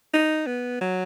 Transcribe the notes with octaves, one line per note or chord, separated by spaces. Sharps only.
D#4
B3
F#3